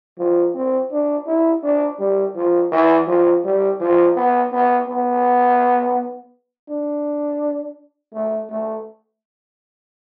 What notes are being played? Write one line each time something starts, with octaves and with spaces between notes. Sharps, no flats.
F3
C4
D4
E4
D4
G3
F3
E3
F3
G3
F3
B3
B3
B3
D4
A3
A3